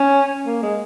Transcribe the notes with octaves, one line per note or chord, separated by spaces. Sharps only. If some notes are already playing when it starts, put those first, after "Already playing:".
Already playing: C#4
A#3
G#3